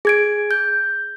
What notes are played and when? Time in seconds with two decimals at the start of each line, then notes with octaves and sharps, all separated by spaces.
0.05 G#4 G#6 D7
0.51 G6